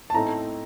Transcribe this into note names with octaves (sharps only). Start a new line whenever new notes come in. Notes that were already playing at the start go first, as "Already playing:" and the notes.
A5
A2 A3 C4 D#4 A#5